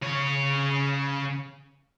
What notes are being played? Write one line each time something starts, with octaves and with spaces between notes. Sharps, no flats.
C#3 C#5